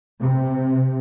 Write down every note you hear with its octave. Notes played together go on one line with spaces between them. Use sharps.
C3